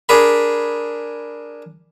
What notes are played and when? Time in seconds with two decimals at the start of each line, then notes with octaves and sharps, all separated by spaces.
0.09 D4 G#4 A#4 B5